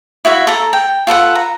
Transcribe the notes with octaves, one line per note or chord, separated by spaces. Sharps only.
E4 F#4 E5 F5
A4 A#5
G5
F4 A4 B4 F#5
A#5